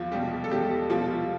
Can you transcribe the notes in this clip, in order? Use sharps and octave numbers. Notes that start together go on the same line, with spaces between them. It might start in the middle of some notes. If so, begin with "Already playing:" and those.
Already playing: E2 F3 F4
B2 G3 G4
A4
E2 G3 G4
B2 F3 G3 F4